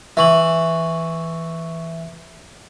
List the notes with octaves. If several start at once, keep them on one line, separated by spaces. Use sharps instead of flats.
E3 E5 C#6 F#7